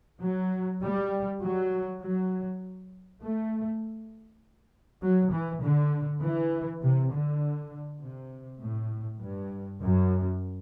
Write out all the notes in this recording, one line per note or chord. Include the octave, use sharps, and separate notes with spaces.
F#3
G3
F#3
F#3
A3
F#3
E3
D3
E3
C3
D3
C3
A2
G2
F#2